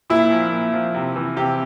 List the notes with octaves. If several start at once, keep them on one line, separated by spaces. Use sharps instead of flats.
A#2 E4
F3
A#2
F3
C3
E3
C3 G4